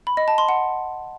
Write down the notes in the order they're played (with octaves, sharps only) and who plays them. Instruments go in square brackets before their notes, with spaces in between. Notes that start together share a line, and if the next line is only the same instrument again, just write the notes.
[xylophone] B5
D#5
A5
C6
F#5